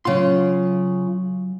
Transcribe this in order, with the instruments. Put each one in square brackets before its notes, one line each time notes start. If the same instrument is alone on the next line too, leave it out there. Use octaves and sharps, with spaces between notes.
[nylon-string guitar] C#3 F4 [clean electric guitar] F#3 F#5 C6